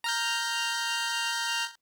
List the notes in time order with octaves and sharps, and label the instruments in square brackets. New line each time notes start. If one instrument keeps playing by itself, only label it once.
[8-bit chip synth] A#5 F6 G6